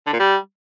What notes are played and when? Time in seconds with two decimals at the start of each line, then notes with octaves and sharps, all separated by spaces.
0.07 D3
0.13 A#2
0.20 G3